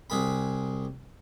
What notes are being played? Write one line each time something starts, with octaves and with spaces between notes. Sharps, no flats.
C2 G#4 B5